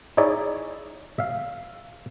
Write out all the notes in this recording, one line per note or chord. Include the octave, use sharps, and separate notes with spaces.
D#4 E4 G#4 C#5 D5 E5
E5 F5